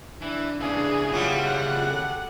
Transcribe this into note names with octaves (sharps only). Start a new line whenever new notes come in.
E3 D4
C#3 E3 D4 G#4
F#3 G3 F4
F#5
A4